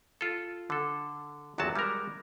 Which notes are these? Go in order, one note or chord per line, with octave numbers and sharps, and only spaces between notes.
F4 A4
D3 A4
G1 E2 C3 F#3 F#4 A5
G3 G#3 G4 A#4 A#5